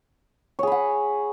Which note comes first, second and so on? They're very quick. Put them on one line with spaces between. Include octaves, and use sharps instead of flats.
C#5 G#4 B5 F#5